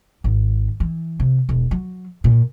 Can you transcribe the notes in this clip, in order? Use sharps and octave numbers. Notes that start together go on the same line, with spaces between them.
G#1
E3
C3
E1
F#3
A#2